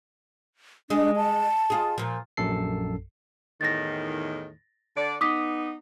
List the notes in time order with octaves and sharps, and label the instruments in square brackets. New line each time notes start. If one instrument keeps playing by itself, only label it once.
[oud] G#3 G#4 [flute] D4
[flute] A5
[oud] F4 G#4
A#2 F3
[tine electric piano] A#1 F#2 A4 C7
[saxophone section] E2 A2 D#3 [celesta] A6 A#6
[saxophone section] D3 D5
[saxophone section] B3 D#4 [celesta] D6 D#6 B6